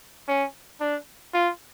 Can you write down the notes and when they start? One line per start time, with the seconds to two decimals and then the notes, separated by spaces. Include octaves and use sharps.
0.28 C#4
0.81 D4
1.34 F4